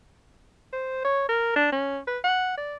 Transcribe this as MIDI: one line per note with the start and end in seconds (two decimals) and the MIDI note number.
0.73 1.01 72
1.04 1.26 73
1.29 1.56 70
1.56 1.68 62
1.72 1.99 61
2.07 2.18 71
2.24 2.57 78
2.57 2.76 74